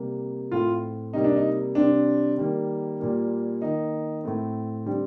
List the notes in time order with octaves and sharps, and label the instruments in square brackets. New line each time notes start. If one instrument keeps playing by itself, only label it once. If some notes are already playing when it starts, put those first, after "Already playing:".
Already playing: [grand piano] C3 G3 A#3
A2 A3 C4 F4
C3 G3 A#3 D#4
D4
D#4
C3 G3 C4 D4
D#3 G3 A#3
A#2 G3 A#3
D#3 A#3 D#4
A2 A3 C4
D3 G3 C4